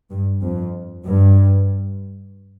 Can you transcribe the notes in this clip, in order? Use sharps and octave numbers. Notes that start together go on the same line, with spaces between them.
G2
F2
G2